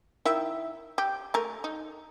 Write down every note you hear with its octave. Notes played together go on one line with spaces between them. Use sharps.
D#3 E4 E5
G4
A3 A#4
D#4